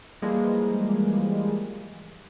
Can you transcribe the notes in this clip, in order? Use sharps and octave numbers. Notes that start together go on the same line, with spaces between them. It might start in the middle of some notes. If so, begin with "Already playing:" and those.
E3 F3 G3 G#3 A#3